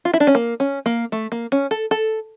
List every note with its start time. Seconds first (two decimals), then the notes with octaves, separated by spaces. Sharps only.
0.05 F4
0.14 E4
0.20 D4
0.27 C#4
0.35 A#3
0.60 C#4
0.86 A#3
1.12 A3
1.32 A#3
1.52 C#4
1.71 A4
1.91 A4